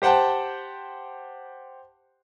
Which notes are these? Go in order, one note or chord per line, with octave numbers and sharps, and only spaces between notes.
G4 C5 F#5 G5 A5